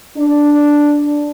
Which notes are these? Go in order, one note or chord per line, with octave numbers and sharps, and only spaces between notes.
D4